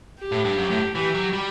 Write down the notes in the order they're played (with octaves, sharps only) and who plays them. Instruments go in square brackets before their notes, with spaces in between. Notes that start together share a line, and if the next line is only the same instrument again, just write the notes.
[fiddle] G4
[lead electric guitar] A2
G2
F#2
A2
[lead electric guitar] E3 [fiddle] G4
[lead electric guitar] F#3
G3